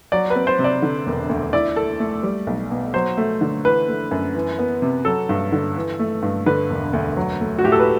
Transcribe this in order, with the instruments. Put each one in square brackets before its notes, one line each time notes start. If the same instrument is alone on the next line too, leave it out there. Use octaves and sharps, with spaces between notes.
[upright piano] F#3 [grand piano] D5
[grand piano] B4
[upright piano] C4
[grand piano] C5
[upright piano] C3
[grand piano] D5
[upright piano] D3
E1
D2
[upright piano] E4 [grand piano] D5
[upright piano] A4
A3
G3
B1
B2
[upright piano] F#3 [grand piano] C5
[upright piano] A3
D3
[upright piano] E3 [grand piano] B4
[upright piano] A3
F#2
E3
B3
C3
[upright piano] F#3 [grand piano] A4
[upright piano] G2
D3
E3
A3
G2
[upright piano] D3 [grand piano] B4
[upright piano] E1
D2
F#3
A3
[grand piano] F#4
[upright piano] A2 [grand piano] G4
[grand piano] A4
B4